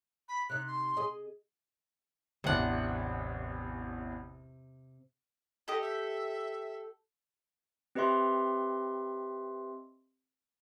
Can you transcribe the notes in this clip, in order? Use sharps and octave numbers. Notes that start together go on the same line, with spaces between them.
B5
C3 D#4 F#6
C6
G#4 D#5
A1 E2 C3 D4 F#5
G4 A4 D#5
E5
C4 G4 B4 D#5 E5 C6